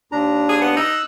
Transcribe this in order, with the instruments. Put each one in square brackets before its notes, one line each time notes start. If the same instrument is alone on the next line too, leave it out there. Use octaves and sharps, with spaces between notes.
[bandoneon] D#2 D4 A#5
[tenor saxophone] G#4
B3
[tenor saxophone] D#4 [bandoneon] E6 F#6